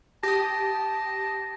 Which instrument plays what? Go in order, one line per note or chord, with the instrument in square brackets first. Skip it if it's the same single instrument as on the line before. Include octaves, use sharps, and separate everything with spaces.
[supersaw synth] G4 D#6 [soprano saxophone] A5 [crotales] A#6